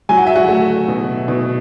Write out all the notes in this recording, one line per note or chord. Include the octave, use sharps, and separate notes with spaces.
F#3 G#5
F#5
E5
F#4 F#5
A3
B2
B2